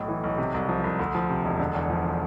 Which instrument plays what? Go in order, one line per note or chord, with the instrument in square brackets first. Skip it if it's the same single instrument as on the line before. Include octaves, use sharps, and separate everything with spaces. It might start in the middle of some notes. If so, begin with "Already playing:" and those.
Already playing: [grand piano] B1 A2
E3
B1
C3
C2
F3
C2
D2
F3
C3
E1
D3
E2
F3